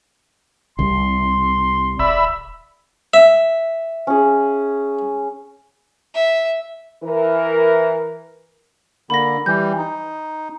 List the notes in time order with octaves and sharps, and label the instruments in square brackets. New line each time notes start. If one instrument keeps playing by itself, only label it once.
[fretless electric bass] C2 [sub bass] C3 [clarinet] C6
[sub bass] E1 [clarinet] D5 [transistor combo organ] E5 B5
[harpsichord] E5
[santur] C#4 G#4
[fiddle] E5
[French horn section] E3 A#4
[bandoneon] D3 A#3 [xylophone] B5 A#6
[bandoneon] E3 G3 [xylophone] G6
[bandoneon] D#4